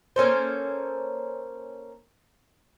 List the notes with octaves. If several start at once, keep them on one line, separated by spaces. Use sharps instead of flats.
A#3 C#4 A4 C5